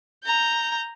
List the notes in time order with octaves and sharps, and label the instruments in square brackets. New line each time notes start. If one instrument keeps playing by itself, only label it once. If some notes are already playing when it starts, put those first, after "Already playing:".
[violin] A#5 G6